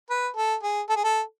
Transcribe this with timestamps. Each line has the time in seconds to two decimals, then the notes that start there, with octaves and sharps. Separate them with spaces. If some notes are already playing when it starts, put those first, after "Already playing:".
0.10 B4
0.36 A4
0.63 G#4
0.89 A4
0.96 G#4
1.04 A4